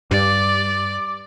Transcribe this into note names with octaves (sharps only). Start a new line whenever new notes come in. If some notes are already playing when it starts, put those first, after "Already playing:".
G2 D5 D6